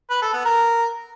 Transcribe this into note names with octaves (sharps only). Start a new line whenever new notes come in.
B4
A4
B3
A#4